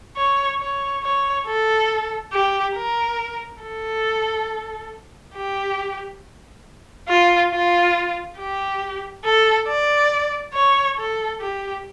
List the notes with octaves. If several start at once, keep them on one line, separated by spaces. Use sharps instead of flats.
C#5
C#5
C#5
A4
G4
A#4
A4
G4
F4
F4
G4
A4
D5
C#5
A4
G4